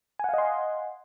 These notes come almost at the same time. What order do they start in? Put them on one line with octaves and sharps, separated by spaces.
G#5 F#5 F5 D#5 C6